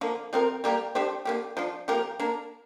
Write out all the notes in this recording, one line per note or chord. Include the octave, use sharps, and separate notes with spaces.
D3 F3 A#3
C3 F3 C4 A#4
G3 A#3 G4 A#4
G3 D4 G4 C5
D3 A#3 G4
F3 D4 F4
F3 A#3 G4 A#4
A#3 D4 A#4